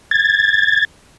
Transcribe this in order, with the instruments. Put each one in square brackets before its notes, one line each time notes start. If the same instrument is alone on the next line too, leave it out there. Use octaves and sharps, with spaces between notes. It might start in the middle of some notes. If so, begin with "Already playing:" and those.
[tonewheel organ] G#6 A6